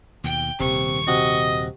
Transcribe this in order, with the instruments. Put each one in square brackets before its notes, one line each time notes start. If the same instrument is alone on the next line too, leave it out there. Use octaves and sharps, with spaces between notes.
[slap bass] D#2 B2 [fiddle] G5
[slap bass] D#1 D#3 [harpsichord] C3 [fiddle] C#6
[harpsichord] C3 F#4 [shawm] D#5